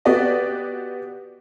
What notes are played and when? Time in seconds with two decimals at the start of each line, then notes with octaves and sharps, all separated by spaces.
0.05 B3 F#4 G4 D5 D#5